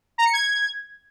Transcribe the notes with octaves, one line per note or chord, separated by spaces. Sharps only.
A#5
C#7
G#6